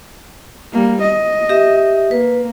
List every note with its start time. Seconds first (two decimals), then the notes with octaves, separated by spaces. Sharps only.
0.72 G3 A#3
1.02 D#5
1.49 G4 E5
2.11 A#3 B4